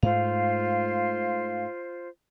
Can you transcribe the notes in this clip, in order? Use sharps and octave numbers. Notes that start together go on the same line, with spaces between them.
G#2 A3 F4 C5 F5